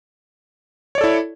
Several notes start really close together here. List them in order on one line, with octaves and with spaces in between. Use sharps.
C#5 D5 A4 E4